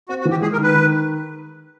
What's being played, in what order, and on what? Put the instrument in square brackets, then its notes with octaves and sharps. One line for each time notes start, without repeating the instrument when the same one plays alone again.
[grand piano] C4 [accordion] F#4
[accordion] F#4
[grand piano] E3
[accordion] G4
[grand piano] G#3 [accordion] G#4
[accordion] A#4
[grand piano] D#3
[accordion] B4
[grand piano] D#3